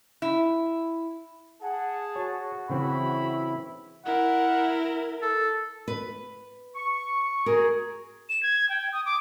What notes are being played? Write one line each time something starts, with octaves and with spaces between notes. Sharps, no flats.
E4
G#4 F#5 A5
F#4 C#5
C#3 E3 C4 E4 B5
E4 A#4 F#5
A4
B4
C#6
F#4 G#4 A#4
E7
G#6
G5
D#6
D6